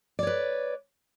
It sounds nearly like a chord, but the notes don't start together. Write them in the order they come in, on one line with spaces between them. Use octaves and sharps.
D5 C#5 B4